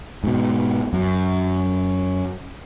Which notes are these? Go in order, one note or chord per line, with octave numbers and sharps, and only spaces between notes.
G#2 B2
F#2